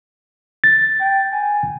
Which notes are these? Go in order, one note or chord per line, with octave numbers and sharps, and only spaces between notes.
A6
G5
G#5